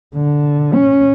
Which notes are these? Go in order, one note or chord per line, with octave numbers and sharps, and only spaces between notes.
D3
C#4